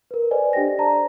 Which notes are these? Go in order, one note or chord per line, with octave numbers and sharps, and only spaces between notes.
A#4 B4
A4 B4 C5 D5 D#5 G#5
D4 G4 A4 D5 G5 A#6
C5 D5 A5 A#5